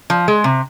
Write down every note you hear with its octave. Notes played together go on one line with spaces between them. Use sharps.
F3
G#3
C3